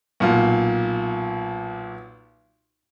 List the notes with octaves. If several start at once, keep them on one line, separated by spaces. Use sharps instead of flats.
B1 A#2